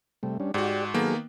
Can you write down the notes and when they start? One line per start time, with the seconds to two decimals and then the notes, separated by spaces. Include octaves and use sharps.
0.23 C3 G3 A3
0.40 G3 C#4 D4
0.54 G#2 F#4 G4 D5
0.94 D#3 F#3 A#3 B3 G#4 A4